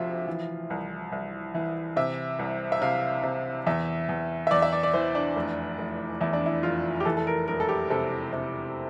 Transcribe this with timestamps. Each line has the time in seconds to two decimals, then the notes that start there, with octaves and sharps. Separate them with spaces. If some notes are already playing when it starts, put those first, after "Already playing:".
Already playing: D2 C3 F3 E5 F5
0.27 E3
0.70 C2
1.12 C2
1.54 E3
1.96 C3 E5
2.39 C2
2.72 E5
2.82 C3 F5
3.23 C3
3.67 E2 E5
4.09 E2
4.47 E5
4.51 E2 D5
4.62 E5
4.73 D5
4.83 D5
4.94 E3 C5
5.15 D4
5.36 F1
5.78 F1
6.21 E2 E4
6.33 D4
6.46 E4
6.63 F1 F4
7.00 G4
7.05 E3 A4
7.17 A4
7.27 A#4
7.48 E1 A#4
7.60 A4
7.69 G4
7.90 C3 A4
8.33 C3